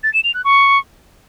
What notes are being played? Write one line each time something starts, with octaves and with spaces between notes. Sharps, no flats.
A6
E7
F7
F#6
C#6